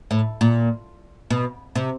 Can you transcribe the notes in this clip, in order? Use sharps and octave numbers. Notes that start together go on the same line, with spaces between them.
A2
A#2
B2
C3